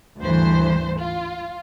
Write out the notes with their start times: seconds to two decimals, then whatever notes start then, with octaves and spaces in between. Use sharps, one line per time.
0.18 G#1 D2 G2 E3 C5
0.97 F4